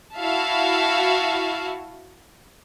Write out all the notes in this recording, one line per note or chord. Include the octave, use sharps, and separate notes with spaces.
E4 F#4 E5 F5 A5